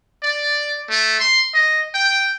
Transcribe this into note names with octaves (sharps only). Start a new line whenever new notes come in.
D5
A3
C6
D#5
G5